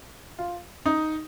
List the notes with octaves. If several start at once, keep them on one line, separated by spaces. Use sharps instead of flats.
F4
D#4